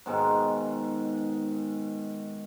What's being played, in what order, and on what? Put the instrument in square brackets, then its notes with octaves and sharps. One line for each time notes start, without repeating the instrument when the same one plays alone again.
[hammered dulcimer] G#2 B2 D#3 G#3